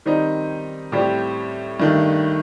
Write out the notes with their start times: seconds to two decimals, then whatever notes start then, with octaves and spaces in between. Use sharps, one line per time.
0.06 D#3 G3 C4 D#4
0.92 A2 G3 C4 G4
1.80 G2 D#3 A3